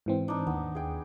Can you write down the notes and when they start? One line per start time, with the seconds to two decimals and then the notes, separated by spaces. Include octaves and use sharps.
0.06 G#2 E3 C4
0.28 D4 D#4
0.47 D#2 B3
0.75 G#4 G5